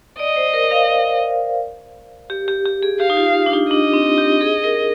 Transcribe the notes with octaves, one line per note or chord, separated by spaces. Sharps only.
D5 D#5
C5
A#4
F5
G4
G4
G4
G#4
G4 F5
D#4
F4
D4
D#4
D4 D#5
C4
G4
G#4
A#4